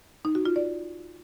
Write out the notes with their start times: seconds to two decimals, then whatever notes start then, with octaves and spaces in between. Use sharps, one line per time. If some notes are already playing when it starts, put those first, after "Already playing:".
0.25 D#4
0.35 F#4
0.45 F4
0.56 D5